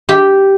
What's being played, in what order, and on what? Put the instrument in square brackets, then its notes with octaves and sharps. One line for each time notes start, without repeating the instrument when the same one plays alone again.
[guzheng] G4